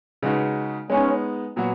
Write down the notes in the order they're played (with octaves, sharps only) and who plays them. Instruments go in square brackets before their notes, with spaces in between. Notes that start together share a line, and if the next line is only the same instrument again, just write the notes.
[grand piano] C#3 G#3 D#4 F#4 B4
[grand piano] G#3 B3 D#4 [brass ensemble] C#4
[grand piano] A#2 F#3 B3 F#4